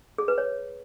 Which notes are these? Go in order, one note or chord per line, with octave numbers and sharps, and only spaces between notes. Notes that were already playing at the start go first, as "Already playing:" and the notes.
G#4
B4
C#5